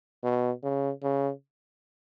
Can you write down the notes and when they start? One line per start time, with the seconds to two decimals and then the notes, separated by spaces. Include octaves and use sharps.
0.23 B2
0.63 C#3
1.03 C#3